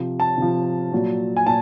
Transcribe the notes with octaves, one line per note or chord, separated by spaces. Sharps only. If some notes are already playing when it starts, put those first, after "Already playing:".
Already playing: C3 F3
A5
C3 F3
A#2 F#3
G#5
A#2 A5